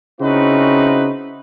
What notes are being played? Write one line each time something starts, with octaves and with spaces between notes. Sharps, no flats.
C#3 C4 D#4 E4 F#4 B4